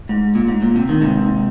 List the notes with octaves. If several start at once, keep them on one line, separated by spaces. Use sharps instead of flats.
G#2
A#2
G#2
A#2
C3
D#3
G#2 C3